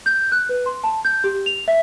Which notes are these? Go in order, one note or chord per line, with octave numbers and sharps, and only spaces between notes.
G6
F#6
B4
C6
A5
G6
G4
F7
E5